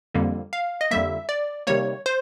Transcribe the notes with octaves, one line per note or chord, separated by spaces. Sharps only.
F2 D3 G3 A#3
F5
D#5
F2 D3 G3 A#3 E5
D5
C3 D#3 G3 A#3 C#5
C5